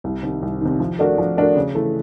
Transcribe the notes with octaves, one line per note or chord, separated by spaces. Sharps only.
C2
C3 D#3
C2
C3 D#3
F3
A3 D4 F#4 A#4
F3
A3 D4 F#4 A#4
C#3
E3 A3